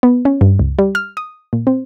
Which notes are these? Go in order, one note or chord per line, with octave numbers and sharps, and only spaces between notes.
B3
C#4
G2
C#2
G3
F6
D#6
A#2
C4